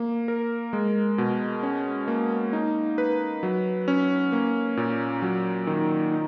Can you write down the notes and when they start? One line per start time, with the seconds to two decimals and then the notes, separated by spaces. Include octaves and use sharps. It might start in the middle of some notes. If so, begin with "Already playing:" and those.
Already playing: A#3
0.28 A#4
0.73 G#3
1.18 B2
1.63 C#4
2.08 A#3
2.53 D#4
2.98 B4
3.43 F#3
3.88 C#4
4.32 A#3
4.77 A#2
5.22 F#3
5.67 D#3
6.12 D#4